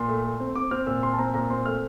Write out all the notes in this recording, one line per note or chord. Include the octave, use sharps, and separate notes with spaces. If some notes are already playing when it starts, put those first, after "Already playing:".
Already playing: A#2 C6
A3
A3
C4
C4 D6
C4 F6
A#2 E6
A#2 C6
A5
C4 A#5
A#2 A#5
C4 C6
A3 F6